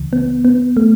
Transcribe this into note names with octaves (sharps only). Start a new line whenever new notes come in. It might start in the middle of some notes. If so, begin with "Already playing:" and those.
Already playing: C#2 C#3 E3
B3
B3
A3